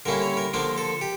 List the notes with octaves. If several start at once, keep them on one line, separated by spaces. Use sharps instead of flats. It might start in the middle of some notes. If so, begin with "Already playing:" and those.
D3 G3 A#3 C#4 E4 A#4
C#5
A#4
D3 F3 A#3 D4 A#4
A4
G4